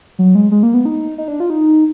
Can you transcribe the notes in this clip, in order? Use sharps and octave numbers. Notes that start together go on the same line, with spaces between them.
F#3
G#3
G#3
A#3
B3
D#4
D#4
D4
F4
D#4